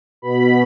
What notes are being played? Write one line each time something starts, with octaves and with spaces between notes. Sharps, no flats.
B2 B5